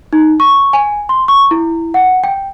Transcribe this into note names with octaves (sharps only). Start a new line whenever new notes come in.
D#4
C#6
G#5
C6
C#6
E4
F#5
G5